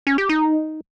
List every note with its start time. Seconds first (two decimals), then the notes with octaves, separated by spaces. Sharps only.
0.07 C#4
0.18 G4
0.29 D#4